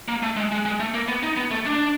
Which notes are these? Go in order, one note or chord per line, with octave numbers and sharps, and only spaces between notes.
A#3
A3
G#3
G#3
G#3
A3
A#3
B3
D#4
B3
A3
D4